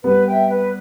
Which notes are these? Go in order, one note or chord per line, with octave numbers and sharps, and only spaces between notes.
G3 B3 B4
E5 G5
B4